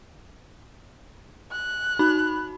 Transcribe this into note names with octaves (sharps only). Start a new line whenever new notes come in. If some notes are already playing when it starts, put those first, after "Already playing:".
F#6
D#4 F#4 B5